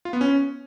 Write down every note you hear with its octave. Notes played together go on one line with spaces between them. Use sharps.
F4
B3
C#4